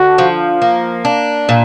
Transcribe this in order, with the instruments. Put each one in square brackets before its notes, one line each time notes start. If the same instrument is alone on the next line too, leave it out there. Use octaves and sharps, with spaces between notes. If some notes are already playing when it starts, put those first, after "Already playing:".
Already playing: [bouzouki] D3 [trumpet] F#4
[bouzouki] F3
A#3
D4
A#2